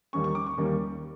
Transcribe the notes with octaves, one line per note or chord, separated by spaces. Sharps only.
D#2 D#3 G3 A#3 C#4 C#6
C#6
D6
C#6
D#2 D#3 G3 A#3 C#4